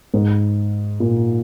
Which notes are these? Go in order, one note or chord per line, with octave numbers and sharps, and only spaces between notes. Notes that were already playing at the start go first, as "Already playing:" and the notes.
G#2
A#2